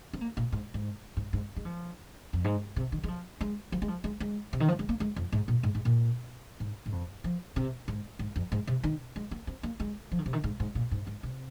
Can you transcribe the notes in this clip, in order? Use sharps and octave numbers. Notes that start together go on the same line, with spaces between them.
C4
A#3
A#2
G#2
G#2
G#2
G#2
G#3
F3
F2
G#2
C3
D#3
G#3
F3
G#3
F3
G#3
F3
G#3
G#3
C3
D#3
F3
G#3
A#3
G#3
F2
G#2
A#2
G#2
G#2
A#2
G#2
G#2
F2
F3
C3
G#2
G#2
F2
G#2
C3
D#3
G#3
A#3
C4
A#3
G#3
F3
D#3
C3
D#3
G#2
G#2
A#2
G#2
G#2
C3